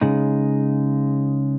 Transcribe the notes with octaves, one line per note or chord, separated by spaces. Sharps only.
C#3 G#3 D#4